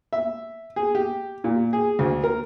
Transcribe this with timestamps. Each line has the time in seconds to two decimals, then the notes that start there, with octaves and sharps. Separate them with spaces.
0.13 E5
0.76 G#4
0.95 G4
1.44 A#2
1.73 G#4
1.99 D2
2.24 A#4